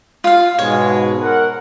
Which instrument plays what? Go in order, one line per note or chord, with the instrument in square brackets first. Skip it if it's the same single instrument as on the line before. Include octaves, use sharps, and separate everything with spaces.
[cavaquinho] F4 F5
[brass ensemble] G#2 B2 G#3 [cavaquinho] C#5
[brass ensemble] A#4 F#5